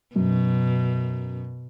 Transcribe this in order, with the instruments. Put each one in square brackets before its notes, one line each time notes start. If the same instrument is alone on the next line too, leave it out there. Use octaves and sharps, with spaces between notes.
[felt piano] F#2 [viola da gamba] B2